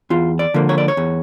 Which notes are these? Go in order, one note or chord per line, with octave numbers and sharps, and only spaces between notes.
E2 F4
D5
D3 F3 A#3
C#5
D5
C#5
E2